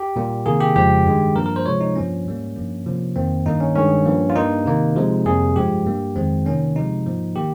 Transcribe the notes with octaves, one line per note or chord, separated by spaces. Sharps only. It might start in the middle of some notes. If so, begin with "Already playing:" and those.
Already playing: G4
A#2 G3 A#3
C3 D#3 A#3 G#4
G4
F2 C#3 F3 G#3 G4
G2 D#3 G#3
G2 F3 A#3 A#4
A#4
C5
C3 F3 G#3 C#5
D#4
G2 F3 A#3 C#4
G#2 G3 A#3
G2 F3 A#3
C3 F3 A#3
F2 D#3 A#3 C4
G2 D#3 A#3 D#4
C#4
G2 D#3 G#3 C#4
G2 F3 A#3
F4
G2 G3 A#3 D#4
C3 D#3 A#3
C3 F3 G#3
F2 C3 G3 A#3 G#4
G2 F3 G#3 G4
G2 G3 A#3
F2 D#3 G#3 C4
C3 D#3 A#3 C#4
C3 F3 G#3 D#4
G#2 F3 A#3
D#3 A#3 G4